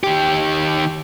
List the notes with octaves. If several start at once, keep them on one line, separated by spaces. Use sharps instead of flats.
D#3 G4